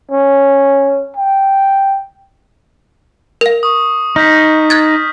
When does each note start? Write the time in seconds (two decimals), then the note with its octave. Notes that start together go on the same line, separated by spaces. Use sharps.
0.12 C#4
1.17 G5
3.41 A#4 F5
3.63 C#6 D#6
4.16 D#4 F6 G6 B6
4.70 F#6 G#6 A6